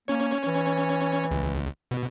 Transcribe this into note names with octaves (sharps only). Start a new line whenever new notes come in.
A#3 C#4 C#5
E3
C#2
B2